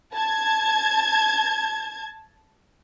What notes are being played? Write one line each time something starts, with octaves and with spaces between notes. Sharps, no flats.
A5 G#6